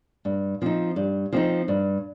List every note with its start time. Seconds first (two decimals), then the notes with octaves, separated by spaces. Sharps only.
0.25 G2
0.62 F3 C4 D#4
0.96 G2
1.33 F3 C4 D#4
1.68 G2